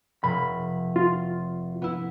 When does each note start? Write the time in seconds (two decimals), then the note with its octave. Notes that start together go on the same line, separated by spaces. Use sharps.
0.24 F1 B5
0.96 F4
1.82 B3 E4